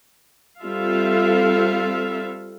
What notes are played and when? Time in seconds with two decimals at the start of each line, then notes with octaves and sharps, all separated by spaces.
0.62 G3 C4 F4 A4 E5 F5